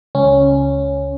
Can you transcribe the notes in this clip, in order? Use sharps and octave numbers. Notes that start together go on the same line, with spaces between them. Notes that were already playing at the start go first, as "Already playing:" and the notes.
C#2 C#4